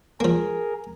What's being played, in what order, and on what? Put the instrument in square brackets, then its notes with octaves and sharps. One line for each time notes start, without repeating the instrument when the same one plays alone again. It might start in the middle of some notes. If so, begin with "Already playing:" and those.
[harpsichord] F3 A#3 [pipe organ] G#4 A#4